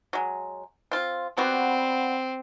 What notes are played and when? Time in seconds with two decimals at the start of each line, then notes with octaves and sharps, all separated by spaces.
0.13 F#3 G#3
0.91 C4 F4
1.37 G3 B3 C4 F#4